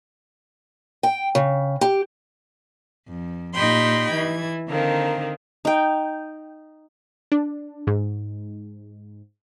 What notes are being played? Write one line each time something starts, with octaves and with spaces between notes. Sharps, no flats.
G5
C#3
G4
F2
A#2 D#4 G4 G5 B5 C6
E3 G#6
D3 D#3 A#3 C4
D#4 G5
D4
G#2